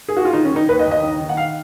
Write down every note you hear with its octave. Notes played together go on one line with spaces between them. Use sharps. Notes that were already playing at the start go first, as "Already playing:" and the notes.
G#4
F#4
F4
D#3 D#4
C#4
D#3 D#4
D#2 B4
D#5
D#2
D#5
D#3
D#3
F#5
F5